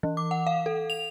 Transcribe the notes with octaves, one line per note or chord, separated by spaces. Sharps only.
E3
D6
F#5
F5
A4
F7